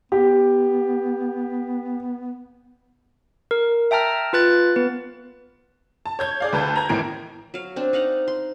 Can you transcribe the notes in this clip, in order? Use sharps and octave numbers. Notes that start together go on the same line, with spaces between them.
B3 G4
A#4
E5 G5 A5 A#5 F6
F4 B4 F#6 A6
B3 B4
A5
C#5 G6 G#6
G#4 D5 F5
D2 B4 A5 G6
A#5 G#6
G#1 A2 E3 A#4 D7
F#3 F5
C4 D4
D#4 F5 F#5 A#5
C6